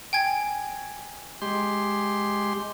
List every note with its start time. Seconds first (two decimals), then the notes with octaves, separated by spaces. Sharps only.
0.13 G5 G#5 G#6
1.42 G#3 G4 C6